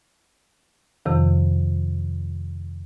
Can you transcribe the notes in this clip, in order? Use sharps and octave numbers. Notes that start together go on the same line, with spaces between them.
F2 C3 D#3 F3